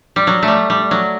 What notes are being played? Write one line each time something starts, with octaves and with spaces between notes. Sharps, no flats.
G3
F#3
A3
G3
G3
F#3